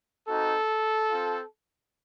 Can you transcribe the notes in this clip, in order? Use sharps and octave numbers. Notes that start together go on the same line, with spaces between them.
C4 D#4 F#4 A4
C4 F4